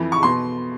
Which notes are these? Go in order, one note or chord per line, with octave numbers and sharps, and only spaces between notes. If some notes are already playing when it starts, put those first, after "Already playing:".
Already playing: F2 E3
C#6
B2 C6